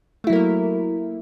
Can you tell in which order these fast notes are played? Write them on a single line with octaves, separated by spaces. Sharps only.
A3 E4 F#3 A#4 A#3